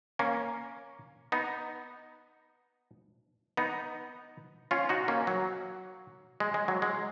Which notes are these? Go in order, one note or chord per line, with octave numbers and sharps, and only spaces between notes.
A#3 C#4
B3 D#4
B3 D#4
C#4 F4
D#4 F#4
A#3 C#4
F#3
G#3
G#3
F#3
G#3